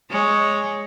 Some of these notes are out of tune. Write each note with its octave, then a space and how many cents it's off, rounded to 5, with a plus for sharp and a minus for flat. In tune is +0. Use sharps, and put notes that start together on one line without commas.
G#3 +0 C#5 +0